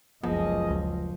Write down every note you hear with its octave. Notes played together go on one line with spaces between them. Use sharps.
F#1 C#2 F3 B3 G#4 D#5
D2